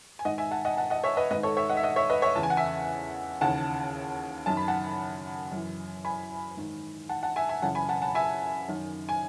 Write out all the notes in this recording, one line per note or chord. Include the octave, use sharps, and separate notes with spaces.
G#5
G#2 D#3 D#5 F#5
E5 G#5
F#5 A5
D#5 F#5
F#5 A5
D#5 F#5
C#5 E5
B4 D#5
G#2 D#3 B4 D#5
A4 C#5
C#5 E5
D#5 F#5
E5
D#5 F#5
C#5 E5
B4 D#5
C#5 E5
E2 C#3 E3 A5
G#5
F#5
E5 G#5
D#2 C#3 E3 F#5 A5
F#2 D#3 A5
B5
F#5 A5
F#2 E3
G#5 B5
G#2 D#3
F#5 A5
F#5 A5
E5 G#5
E5 G#5
F#2 C#3 E3 F#5 A5
G#5 B5
F#5 A5
F#5 A5
E5 G#5
F#2 D#3
G#5